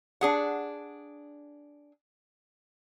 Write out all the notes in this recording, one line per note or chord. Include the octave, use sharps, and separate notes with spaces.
D4 G#4 F#5